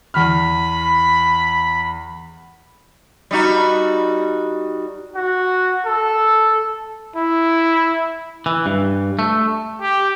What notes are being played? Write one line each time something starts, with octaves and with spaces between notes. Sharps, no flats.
E2 B5 F6
G3 D#4 F#4
F#4
A4
E4
E3
G2
A3
G4